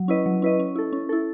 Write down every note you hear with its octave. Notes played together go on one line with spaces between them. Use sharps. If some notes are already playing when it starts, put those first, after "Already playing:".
Already playing: F#3
C#4 E4 B4 D#5
F#3
C#4 E4 B4 D#5
C#4
E4 A4
C#4
E4 A4